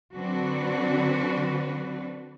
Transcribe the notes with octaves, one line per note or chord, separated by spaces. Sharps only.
D3 F#3 C4 D4 F#4 B4